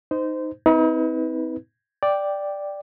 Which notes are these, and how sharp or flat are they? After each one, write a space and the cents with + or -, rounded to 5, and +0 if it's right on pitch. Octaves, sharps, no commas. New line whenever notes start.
D#4 +0 C5 -25
C4 -20 D#4 +45 B4 +0
D5 +0 G5 +0